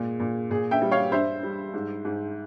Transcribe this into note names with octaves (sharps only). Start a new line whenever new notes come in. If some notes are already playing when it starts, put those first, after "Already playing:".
Already playing: A#2 G#3
A#2
A#2 G#4
E5 G5
G3
C#5 F5
G2 C5 E5
G3
G#2
G#2